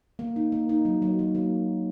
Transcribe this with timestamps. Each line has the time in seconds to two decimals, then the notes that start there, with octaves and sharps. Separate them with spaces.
0.19 A#3
0.36 D#4
0.52 A#3
0.69 D#4
0.85 F#3
1.02 F#3
1.19 F#3
1.35 A#3